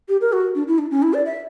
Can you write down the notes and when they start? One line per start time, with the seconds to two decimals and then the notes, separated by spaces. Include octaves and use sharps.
0.09 G4
0.21 A#4
0.33 F#4
0.55 D4
0.68 E4
0.78 D4
0.91 C#4
1.02 E4
1.14 D5
1.26 E5